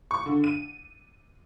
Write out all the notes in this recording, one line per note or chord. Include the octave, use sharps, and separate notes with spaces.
C#6
D3
D#7